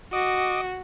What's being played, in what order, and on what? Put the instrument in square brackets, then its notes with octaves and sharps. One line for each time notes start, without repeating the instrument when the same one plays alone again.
[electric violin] F#4 [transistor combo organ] D#5 D6